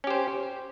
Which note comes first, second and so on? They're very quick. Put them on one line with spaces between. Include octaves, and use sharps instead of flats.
C#4 G4 C5